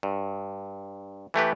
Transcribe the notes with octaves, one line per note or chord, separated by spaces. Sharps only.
G2
E3 A3 G4 B4